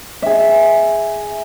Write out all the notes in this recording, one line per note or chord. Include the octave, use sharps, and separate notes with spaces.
G#4 E5